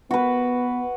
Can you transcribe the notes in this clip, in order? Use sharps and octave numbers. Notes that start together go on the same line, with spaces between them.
B3 F#4 B4